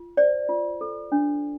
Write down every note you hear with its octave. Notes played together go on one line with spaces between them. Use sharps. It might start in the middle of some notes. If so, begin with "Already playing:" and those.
Already playing: F4
C5 D5
F4
A4
D4